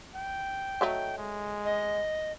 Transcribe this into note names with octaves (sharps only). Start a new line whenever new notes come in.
G5
F#3 A3 D#4
G#3
D#5